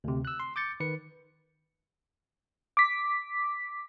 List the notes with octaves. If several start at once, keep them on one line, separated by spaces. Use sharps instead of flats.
D2 C3
E6 F#6
C6
D6 G6 A6 C#7
D#3 B4 C#7
D6 B6